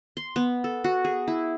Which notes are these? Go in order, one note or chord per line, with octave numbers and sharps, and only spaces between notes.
C6
B3
A4
F#4
G#4
E4